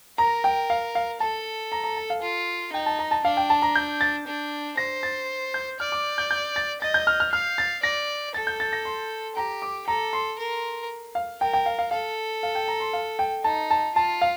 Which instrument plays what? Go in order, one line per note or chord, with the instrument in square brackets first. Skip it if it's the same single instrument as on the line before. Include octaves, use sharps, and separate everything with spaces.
[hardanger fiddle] A#4 [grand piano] A#5
[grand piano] G5
F5
F5
[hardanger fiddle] A4 [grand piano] A5
[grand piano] A#5
A#5
A5
F5
[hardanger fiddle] F4
[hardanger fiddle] D#4 [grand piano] G5
[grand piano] A5
A#5
A5
[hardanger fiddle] D4 [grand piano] F5
[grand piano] G5
A5
A#5
G6
A6
[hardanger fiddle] D4
[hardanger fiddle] C5 [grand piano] A#6
[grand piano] A6
G6
[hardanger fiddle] D5 [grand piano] F6
[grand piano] D6
G6
G6
A6
[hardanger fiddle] D#5 [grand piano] A6
[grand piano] G6
F6
F6
[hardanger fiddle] F5 [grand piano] F6
[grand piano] A6
[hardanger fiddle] D5 [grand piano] A#6
[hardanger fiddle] A4 [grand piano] A6
[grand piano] G6
A6
A#6
C6
[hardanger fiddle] G4 [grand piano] A#5
[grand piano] D6
[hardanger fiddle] A4 [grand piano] A#5
[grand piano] C6
[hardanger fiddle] A#4
[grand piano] F5
[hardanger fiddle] A#4 [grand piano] G5
[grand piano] G5
F5
F5
[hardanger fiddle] A4 [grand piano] F5
[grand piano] F5
G5
A#5
C6
F5
G5
[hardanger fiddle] D#4 [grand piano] A5
[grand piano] A5
[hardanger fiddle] F4 [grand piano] A5
[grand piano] F5